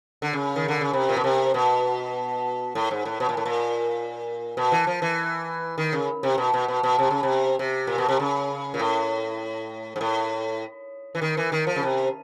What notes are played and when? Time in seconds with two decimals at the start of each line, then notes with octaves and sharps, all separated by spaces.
0.22 D3
0.33 C#3
0.56 D#3
0.68 D3
0.81 C#3
0.93 C3
1.09 A#2
1.17 B2
1.24 C3
1.54 B2
2.75 A2
2.91 G#2
3.05 A2
3.20 B2
3.29 A#2
3.37 A2
3.45 A#2
4.57 B2
4.72 E3
4.87 F3
5.02 E3
5.78 D#3
5.93 C#3
6.23 C3
6.38 B2
6.54 B2
6.68 B2
6.83 B2
6.99 C3
7.10 C#3
7.23 C3
7.59 C3
7.87 A#2
7.98 B2
8.09 C3
8.20 C#3
8.74 A#2
8.79 A2
9.96 G#2
10.01 A2
11.15 E3
11.22 D#3
11.37 E3
11.52 D#3
11.67 F3
11.76 C#3
11.83 C3